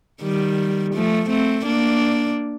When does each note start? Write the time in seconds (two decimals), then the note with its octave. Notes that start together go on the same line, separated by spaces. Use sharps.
0.22 D#3 G3
0.94 F3 A3
1.29 A3 C4
1.66 A#3 D4